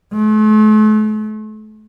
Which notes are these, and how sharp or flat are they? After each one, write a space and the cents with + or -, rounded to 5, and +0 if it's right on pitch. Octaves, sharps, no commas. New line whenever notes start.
A3 -40